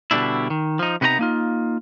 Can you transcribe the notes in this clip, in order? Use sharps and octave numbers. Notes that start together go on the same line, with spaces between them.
B2 D3 G3 D4 E4
D#3
F3 D#4
C3 B3 D#4 B4 A#5
A#3 D#4 F4